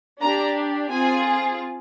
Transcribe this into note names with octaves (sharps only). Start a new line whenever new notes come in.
D4 G4 A#5
C4 F4 G#4 G#5